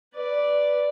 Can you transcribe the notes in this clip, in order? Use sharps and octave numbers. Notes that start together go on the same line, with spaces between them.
B4 D5